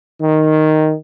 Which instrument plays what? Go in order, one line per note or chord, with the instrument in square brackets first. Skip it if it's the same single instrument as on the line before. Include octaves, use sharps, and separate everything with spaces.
[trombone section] D#3